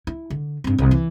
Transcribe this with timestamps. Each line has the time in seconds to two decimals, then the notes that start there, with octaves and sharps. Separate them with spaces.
0.07 E4
0.30 D3
0.64 G2 C4
0.78 C2
0.91 E3